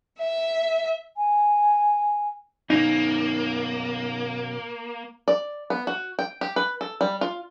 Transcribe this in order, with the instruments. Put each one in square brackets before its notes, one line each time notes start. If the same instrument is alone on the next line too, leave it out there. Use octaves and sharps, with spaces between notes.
[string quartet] E5
[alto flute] G#5
[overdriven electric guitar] B2 C#4 [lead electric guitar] A#3 [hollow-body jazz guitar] D#4
[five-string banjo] D5
B3
F#4
G5
G4
B4
A4
G3
F4